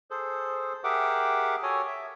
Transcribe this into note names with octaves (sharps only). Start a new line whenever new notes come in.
G#4 A4 C5
G4 G#4 A#4 E5 F#5 D6
F#4 A4 C#5 G#5 D#6
E5